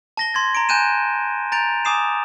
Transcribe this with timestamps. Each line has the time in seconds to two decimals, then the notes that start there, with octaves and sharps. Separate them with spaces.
0.17 A5 A#6 G7
0.34 C6 G#6 A6
0.55 A#5 C6 D7
0.69 G#5 F#6 G6 D#7 E7
1.52 A#5 G6 A6 D7 F7
1.85 G#5 D6 D#6 C7 E7